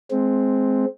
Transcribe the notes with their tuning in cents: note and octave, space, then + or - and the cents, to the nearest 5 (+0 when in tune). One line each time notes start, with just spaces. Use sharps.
G#3 +25 C4 +0